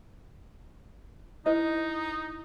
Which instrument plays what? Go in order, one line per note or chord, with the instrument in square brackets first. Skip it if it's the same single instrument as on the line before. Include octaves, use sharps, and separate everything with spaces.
[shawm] D#4 [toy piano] E4 C5 [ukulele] D#5